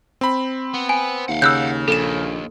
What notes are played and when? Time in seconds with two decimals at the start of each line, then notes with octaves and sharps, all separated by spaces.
0.21 C4 B5
0.74 B3
0.89 G#5
1.28 D#2 F5 F#5
1.42 C#3 E6 F#6 G6
1.88 A#1 D#2 A4 E7